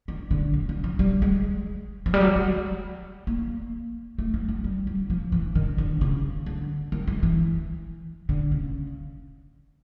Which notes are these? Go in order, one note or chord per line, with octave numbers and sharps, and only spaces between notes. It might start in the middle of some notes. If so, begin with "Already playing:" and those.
D#3
D3
D3
C#3
F3
G3
G#3
F3
G3
F#3
G#3
A#3
A3
A3
G#3
G3
F#3
F3
E3
D#3
D3
C#3
D3
D#3
G#3
E3
D3
C#3